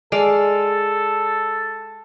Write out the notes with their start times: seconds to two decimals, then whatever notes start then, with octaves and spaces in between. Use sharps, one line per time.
0.12 G#3 A4 D5 F5